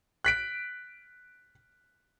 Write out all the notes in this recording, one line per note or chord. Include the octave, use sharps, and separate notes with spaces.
F#6 B6 D7